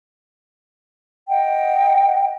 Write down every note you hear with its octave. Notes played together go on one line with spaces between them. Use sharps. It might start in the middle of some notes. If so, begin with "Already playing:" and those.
D#5 F#5 G5